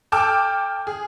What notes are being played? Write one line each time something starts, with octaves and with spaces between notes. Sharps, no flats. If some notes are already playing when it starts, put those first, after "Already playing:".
A4 G5 A5 D6 E6 F6
G#4